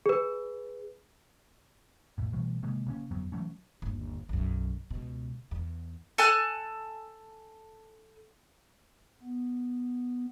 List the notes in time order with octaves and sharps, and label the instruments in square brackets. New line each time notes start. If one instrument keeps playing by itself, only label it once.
[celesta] G#4 B4
[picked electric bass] A#1 F2 A2
B2 E3 G3 A3
C3 D#3 G#3 A#3
C#3 A#3 C#4
G1 F2 F#3 B3
E3 F#3 A3 C#4
[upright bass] G1 D#2
B1 F#2
C#2 B2
E2
[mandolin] A4 G#5 A5 F#6
[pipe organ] B3